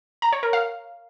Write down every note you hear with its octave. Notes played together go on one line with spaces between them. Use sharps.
A#5
C#5
A#4
F5